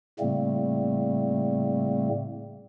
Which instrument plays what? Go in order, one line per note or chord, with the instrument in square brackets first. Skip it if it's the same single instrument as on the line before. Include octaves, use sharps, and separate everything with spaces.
[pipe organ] A2 C#3 G3 A3 A#3 C4